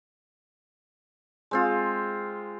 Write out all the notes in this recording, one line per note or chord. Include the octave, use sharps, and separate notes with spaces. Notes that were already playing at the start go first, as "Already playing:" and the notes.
G#3 C4 F4